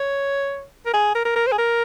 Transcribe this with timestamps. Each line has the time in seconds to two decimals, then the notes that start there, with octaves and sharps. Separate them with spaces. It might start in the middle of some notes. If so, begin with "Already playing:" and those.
Already playing: C#5
0.85 A#4
0.93 G#4
1.15 A#4
1.25 A#4
1.36 A#4
1.47 C5
1.52 G#4
1.58 A#4